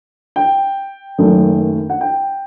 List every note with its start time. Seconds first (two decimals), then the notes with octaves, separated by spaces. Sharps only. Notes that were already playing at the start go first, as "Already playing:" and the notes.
0.36 G5
1.18 F#1 F#2 D#3 A3
1.90 F#5
2.01 G5